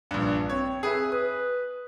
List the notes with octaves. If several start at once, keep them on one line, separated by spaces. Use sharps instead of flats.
A#1 G2
C4 C#5
G#4 B4 E5
B4 D#6